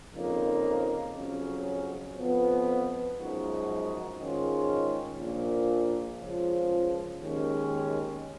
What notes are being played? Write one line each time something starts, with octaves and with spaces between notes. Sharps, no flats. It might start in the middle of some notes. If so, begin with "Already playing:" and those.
F2 C#3 F3 A#3 D#4
F2 C#3 F#3 C#4
F2 F3 B3
F#2 F3 G#3 D#4 F#4
G#2 D#3 G#3 C#4 F4
A#1 A#2 F3 A#3
C#2 C#3 F3
D#2 D#3 G#3 C#4